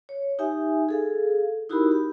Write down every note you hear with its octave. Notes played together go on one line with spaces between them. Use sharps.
C#5
D#4 G4 E5 G#5
G#4 A4 F5
D#4 E4 F#4 G4 A#4 B5
G4